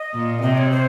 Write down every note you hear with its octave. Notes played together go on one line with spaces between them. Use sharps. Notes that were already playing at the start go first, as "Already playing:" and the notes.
Already playing: D#5
A#2
C3 D#5
C#5
C5